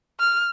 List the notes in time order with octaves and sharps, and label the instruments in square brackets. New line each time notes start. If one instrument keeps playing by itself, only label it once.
[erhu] F6